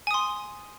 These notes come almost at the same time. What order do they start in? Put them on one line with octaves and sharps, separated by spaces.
G#5 D#6 C6